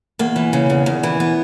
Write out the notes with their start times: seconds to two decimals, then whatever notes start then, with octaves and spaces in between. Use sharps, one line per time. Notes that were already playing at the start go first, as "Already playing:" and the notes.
0.19 E2 A#3
0.36 E3
0.53 C#3
0.70 E2
0.86 E2
1.03 E3
1.20 B3